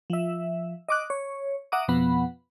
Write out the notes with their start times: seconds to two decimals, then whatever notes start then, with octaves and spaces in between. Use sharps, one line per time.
0.10 F3 E5
0.89 D#5 D6 F#6
1.10 C#5
1.72 E5 F#5 A#5 D6 D#6
1.88 F2 B2 F3 B3 F#5 B5